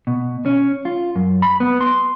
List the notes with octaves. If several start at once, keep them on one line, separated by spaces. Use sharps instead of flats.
B2
C#4
F4
F#2
B5
B3
C6